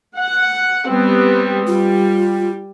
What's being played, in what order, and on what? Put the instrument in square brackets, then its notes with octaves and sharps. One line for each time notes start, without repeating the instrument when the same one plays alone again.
[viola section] F#5
G3 B3 C4
[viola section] G3 [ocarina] F4